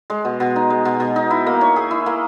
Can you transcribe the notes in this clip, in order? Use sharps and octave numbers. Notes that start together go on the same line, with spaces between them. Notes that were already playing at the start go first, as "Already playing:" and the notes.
G#3
B2
B2
D#4
G#3
B2
B2
D#4
E4
A#3
C#5
G#4
E4
A#3